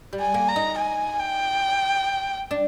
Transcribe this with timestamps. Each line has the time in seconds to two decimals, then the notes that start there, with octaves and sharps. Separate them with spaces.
0.13 G3
0.20 G#5
0.34 A#3
0.49 A#5
0.56 D#4
0.78 G#5
1.20 G5
2.51 D4